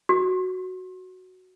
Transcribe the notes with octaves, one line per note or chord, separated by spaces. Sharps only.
F#4